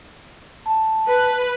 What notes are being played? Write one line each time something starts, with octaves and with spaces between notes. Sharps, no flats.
A5
B4